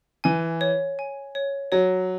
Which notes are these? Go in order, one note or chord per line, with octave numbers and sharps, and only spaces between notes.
E3 G#5
C#5
G#5
C#5
F#3 C#5